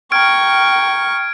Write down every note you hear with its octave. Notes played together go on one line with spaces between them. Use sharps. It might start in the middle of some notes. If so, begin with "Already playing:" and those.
G5 A#5 C#6 F6 G#6 D7